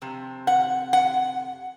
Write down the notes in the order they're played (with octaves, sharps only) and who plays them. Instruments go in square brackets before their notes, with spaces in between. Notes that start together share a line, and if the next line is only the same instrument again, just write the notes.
[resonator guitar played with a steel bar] F2 C3
F#5
F#5